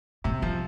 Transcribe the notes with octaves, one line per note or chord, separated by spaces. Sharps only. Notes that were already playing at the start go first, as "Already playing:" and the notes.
A2 C3
G2 F3